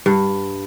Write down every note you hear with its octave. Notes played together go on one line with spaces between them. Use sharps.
G2